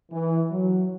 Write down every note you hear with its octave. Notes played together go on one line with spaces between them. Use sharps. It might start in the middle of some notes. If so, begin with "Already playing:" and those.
E3
F#3